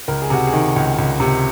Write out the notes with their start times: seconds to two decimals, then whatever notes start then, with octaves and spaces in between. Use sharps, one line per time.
0.08 C#2 A#4
0.22 G#4
0.30 C3 F#4
0.47 G#4
0.53 D#3
0.76 C#2
0.98 C#2
1.20 C3